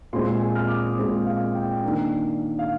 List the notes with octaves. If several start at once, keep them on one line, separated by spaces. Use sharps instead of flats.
A#2 G#3 C4 C6
G#5
F6
D6
D#6
A#2 G#3 C4
F5
G5
D#3 A#3 D4
F5